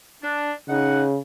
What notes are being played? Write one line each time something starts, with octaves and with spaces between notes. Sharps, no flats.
D4
C#3 D#4 F#5